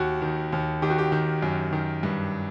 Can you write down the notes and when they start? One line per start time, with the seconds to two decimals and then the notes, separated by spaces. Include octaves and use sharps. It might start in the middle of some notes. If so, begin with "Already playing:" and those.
Already playing: D#2 F#4
0.22 D#3
0.52 D#2
0.82 D#3 G4
0.90 F#4
0.98 G4
1.12 D#3
1.42 F#2
1.73 D#3
2.03 G2